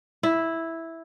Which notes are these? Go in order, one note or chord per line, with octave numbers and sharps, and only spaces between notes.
E4